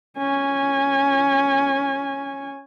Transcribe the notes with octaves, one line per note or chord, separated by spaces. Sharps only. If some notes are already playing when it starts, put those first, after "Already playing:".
C#4 G#5